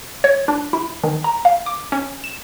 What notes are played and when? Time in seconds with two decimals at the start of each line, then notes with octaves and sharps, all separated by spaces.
0.24 C#5
0.48 D4
0.73 E4
1.04 D#3
1.24 A#5
1.45 F5
1.66 D6
1.92 C#4
2.24 E7